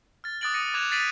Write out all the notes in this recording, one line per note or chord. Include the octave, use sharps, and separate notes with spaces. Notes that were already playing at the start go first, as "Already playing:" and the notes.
F6 A6
D6 D#6 F#6 A6 D7 F#7
D#6 A#6 C#7 D#7
D6 F#6 G#6 A6 E7 F7
A6 B6 C7 D7 D#7 F#7